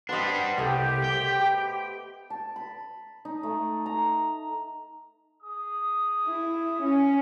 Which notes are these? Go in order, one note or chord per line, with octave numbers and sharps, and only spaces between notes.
G3 B3 D4 C5 D#5
C2 A3 G4 D#5
G5
A5
B5
D#4
A3
A#5
G#4 D#6
E4
C#4